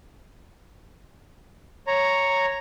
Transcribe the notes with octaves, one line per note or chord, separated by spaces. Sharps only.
C#5 A#5